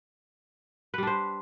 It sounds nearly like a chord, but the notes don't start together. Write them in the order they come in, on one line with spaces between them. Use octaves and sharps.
B4 G3 D4 C5